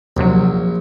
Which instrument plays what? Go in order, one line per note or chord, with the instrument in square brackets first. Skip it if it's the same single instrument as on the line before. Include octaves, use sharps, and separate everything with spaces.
[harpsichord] A#1 [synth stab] D#2 C3 F#3